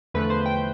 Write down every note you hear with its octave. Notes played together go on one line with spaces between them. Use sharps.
E2 D3 F3 A3 B4
C5
G5